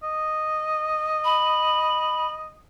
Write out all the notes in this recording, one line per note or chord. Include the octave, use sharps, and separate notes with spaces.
D#5
B5